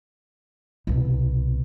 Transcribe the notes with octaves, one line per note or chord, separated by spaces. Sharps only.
C2 B2